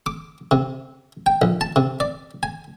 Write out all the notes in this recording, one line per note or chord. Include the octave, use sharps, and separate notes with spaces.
D6
C3
G5
A#1
A5
C3
D5
G#5